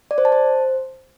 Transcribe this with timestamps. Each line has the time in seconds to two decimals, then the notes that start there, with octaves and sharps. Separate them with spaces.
0.11 D5
0.18 C5
0.25 A5
0.32 C5